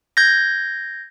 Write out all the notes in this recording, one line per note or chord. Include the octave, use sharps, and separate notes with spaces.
G6 G#6 A#6